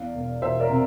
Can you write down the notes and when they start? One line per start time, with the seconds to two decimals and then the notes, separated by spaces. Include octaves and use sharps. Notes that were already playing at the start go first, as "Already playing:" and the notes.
Already playing: E2 D5 F5
0.15 E1
0.42 E1 C5 E5
0.60 A#4 D5
0.70 C3